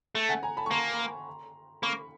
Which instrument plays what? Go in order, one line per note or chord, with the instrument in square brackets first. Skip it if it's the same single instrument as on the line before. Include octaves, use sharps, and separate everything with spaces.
[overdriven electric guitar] A3
[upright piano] F#5 G#5
G#5 A#5
A5 B5
C#6
[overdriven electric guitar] A#3 [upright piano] A#5 C6
[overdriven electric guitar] A#3 [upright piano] B5 C#6